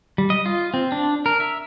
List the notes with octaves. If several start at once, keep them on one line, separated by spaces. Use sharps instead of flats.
G3
D#5
F4
C4
D4
A#4
E5